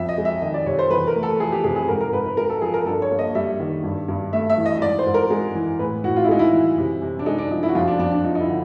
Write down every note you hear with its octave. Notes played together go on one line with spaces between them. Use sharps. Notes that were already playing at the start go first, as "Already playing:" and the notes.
Already playing: F2 E5
D#5
G#3
E5
D#3 D#5
D5
C3 C#5
C5
E2 B4
A#4
A3
A4
F3 G#4
G4
C3 G#4
G#4
G#2 A#4
A#4
G#2 B4
B4
G#3 A#4
A4
F3 G#4
A#4
G2 A4
C#5
A#3
D#5
G3 E5
D#3
G2
G2
A3 E5
E5
E3
D#5
D#5
G#2 D5
C5
G#2
A#4
G#3
E3
A2 B4
A2 F#4
F4
E4
G#3 D#4
E4
E3
C3
C3
D4
G#3 D#4
D4
F3 D#4
E4
F#4
F2 F4
D4
F2 D4
D4
F3 D#4
D#4
E4
D3